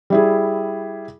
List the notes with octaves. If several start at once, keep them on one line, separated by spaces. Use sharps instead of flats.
G3 E4 G#4